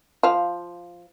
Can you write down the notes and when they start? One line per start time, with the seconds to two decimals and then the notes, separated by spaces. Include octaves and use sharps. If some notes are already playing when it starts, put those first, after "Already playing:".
0.23 F3 F4